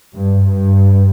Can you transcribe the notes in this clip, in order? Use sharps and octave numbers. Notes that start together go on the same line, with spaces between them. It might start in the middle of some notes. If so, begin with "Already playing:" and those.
G2
G2